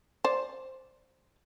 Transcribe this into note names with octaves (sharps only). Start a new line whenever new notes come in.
C5 D5